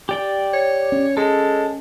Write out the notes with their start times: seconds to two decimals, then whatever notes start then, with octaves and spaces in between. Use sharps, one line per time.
0.09 G4 D5 G5
0.53 C#5
0.92 C#4
1.17 G#3 A4